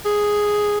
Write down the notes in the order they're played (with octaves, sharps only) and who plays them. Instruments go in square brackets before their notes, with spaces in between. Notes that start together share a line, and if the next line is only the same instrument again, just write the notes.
[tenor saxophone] G#4